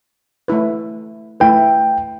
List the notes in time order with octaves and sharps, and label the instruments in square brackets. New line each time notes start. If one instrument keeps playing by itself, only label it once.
[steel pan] A3 E4 B4
[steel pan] A3 E4 B4 [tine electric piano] G5